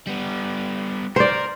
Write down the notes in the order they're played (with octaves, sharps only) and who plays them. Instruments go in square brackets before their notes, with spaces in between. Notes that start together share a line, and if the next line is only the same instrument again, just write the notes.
[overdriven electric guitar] G3 B3
[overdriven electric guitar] A#4 [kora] C5 D5